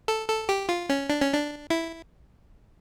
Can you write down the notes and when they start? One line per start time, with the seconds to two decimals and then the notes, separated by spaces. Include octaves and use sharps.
0.08 A4
0.28 A4
0.49 G4
0.69 F4
0.89 C#4
1.10 D4
1.22 C#4
1.34 D4
1.70 E4